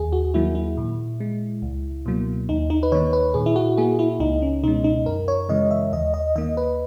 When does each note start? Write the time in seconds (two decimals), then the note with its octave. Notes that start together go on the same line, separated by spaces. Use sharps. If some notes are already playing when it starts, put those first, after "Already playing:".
Already playing: D#2 G#4
0.13 F#4
0.34 D#3 F#3 A#3 E4
0.55 E4
0.77 A#2
1.20 G#3
1.62 C#2
2.06 B2 F#3 A#3
2.49 D#2 D#4
2.70 D#4
2.83 B4
2.92 D#3 A#3 C#5
3.13 B4
3.34 A#2 G#4
3.46 E4
3.56 F#4
3.77 A#3 G#4
3.99 E4
4.20 C#2 D#4
4.42 C#4
4.63 B2 G#3 D#4
4.84 D#4
5.06 F#2 A#4
5.28 C#5
5.49 C#3 E3 G#3 D#5
5.71 E5
5.92 D#2 D#5
6.14 D#5
6.36 D#3 A#3 D#5
6.57 B4